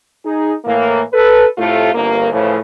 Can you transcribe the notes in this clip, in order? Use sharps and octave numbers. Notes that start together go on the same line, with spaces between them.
D#4 G#4
A2 E3 A#3
A4 B4
A2 C3 A3 F4
G1 C2 A#3
A2 C#3 E3 F3